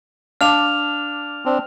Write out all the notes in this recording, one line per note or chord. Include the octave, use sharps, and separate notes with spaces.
D4 F5 A5 D6 F6 F7
C4 D4